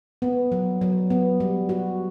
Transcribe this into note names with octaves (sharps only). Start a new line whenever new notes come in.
B3
F#3
F#3
B3
G3
F#4